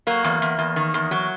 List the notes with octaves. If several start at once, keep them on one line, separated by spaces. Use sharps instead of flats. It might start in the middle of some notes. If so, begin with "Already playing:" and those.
F#3 A#3
E2
E2
E2
D#3
E2
F#3